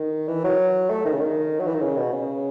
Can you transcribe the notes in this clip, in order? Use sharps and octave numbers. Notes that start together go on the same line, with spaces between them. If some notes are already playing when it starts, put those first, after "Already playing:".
Already playing: D#3
E3
F#3
A3
D#3
C#3
D#3
F#3
E3
D#3
C#3
B2
C#3